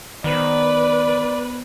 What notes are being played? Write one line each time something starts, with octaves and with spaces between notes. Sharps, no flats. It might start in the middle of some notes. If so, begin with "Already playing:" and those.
D#3 B3 B4 C5 D5